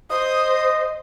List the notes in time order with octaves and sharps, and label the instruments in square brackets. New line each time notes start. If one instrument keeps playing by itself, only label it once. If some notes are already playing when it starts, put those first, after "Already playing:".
[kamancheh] C5 [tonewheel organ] D#5 [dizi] D#6